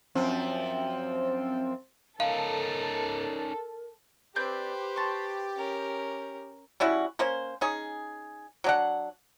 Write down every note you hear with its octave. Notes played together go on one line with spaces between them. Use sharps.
F#2 F3 C4
C#4 D#4 A4 A#4 F5
C4 D4 G4 B4 C5 G6
A5 C6 C#6
C#4 A#4
G3 C#4 E4 F#4
A#3 C#4 C5
C#4 D#4 G#4
F#3 D4 F#5